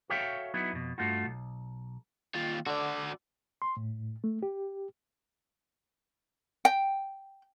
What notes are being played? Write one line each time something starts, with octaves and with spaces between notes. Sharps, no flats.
F#4 A4 C#5 E5 F5 G5
F#3 B3 D#4 E4
F2 B2
G2 A3 F4 F#4
B1
D#2 F4
D3 F#4 D5
C6
A2
A3
G4
G5